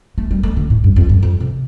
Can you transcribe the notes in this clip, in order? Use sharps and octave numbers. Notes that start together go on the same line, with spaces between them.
A3
G3
A3
D3
A2
G2
F2
G2
F2
C3